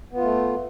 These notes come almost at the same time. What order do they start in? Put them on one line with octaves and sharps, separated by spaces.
B3 F4 A3